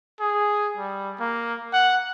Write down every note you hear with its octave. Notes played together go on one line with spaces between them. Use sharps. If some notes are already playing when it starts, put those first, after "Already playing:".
G#4
G3
A#3
F#5